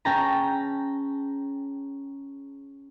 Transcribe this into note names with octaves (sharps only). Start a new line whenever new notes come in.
C#4 G#4 G5 A5 A#5